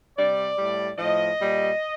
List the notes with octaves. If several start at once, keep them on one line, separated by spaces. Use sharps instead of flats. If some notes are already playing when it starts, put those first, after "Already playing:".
C3 G3 D5
A2 G3
A2 F3 D#5
A#2 G3